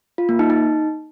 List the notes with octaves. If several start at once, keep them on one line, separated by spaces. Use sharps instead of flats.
F4
A#3
D#4
D#4